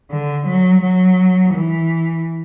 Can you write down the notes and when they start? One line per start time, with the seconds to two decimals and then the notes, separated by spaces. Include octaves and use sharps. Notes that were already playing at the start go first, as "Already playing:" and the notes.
0.11 D3
0.47 F#3
0.82 F#3
1.53 E3